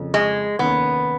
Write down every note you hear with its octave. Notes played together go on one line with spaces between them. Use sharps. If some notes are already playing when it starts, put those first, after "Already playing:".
Already playing: F#1 F2 C#3 F3
G#3
F1 D#2 D#3 A#3 B3 C#4